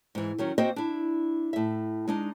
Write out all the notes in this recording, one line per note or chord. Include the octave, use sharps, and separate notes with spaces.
G#2 E3
D#3 F#3 C#4
A#3 C4 F#4 C5 D#5 G5
D4 E4
A2 E5
G#3 D4 D#4